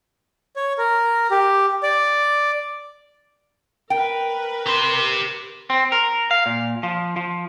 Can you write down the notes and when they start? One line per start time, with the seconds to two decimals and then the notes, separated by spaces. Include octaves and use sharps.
0.56 C#5
0.78 A#4
1.31 G4
1.83 D5
3.90 A#4 B4 G5
4.67 G4 C6
5.70 C4
5.92 A#4
6.31 F5
6.46 A#2
6.83 F3
7.16 F3